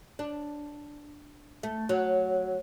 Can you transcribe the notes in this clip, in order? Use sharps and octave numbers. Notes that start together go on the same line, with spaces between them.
D4
A3
F#3